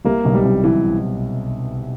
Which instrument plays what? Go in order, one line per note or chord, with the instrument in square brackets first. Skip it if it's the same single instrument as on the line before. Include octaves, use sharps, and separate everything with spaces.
[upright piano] C2 C3 [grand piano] A#3
[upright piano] B1 B2
[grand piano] G3
[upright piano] C2 C3
[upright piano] C2 C3 [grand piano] E3